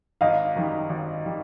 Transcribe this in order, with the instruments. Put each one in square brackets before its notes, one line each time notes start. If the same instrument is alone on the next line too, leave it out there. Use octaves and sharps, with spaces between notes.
[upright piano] G#1 [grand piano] D#5 F5
[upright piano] F#2 D#3 G3
G#1
D#3 G3